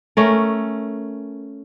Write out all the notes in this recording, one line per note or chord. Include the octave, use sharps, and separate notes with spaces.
A3 C#4 A#4